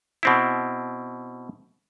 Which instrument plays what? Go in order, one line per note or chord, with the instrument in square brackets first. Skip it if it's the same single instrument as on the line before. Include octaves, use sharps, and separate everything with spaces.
[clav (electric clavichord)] B2 C4 E4